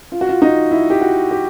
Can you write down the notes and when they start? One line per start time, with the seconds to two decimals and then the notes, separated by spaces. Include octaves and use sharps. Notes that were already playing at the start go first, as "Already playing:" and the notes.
0.12 F4
0.21 F#4
0.29 F4
0.42 D#4
0.71 E4
0.90 G4
1.01 F#4
1.31 G4